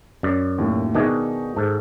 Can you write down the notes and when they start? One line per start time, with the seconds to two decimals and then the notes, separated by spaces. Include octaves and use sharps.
0.23 F#2 D5
0.58 D#2 A2
0.95 B2 D#3 D4 D#4 G#4 C#6
1.56 G#2 A4